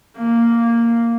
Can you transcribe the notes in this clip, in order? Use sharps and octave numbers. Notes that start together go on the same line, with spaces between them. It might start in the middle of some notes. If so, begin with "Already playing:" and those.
A#3